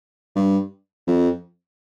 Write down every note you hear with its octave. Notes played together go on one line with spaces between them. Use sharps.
G2
F2